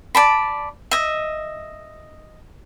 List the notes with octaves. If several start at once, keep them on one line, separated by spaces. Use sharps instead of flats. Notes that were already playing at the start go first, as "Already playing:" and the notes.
D5 A5 B5
D#5 E5